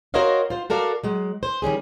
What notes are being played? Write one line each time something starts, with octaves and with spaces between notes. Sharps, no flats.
F#4 A#4 C5 C#5 D#5 F5
F4 C5
F#4 A4 A#4 D5 F5
F#3 G#3
C5
D#3 G3 C#4 G#4